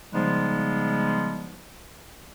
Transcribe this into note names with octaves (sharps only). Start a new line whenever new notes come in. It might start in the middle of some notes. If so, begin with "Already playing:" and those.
C#3 F3 G3 G#3 B3 D#4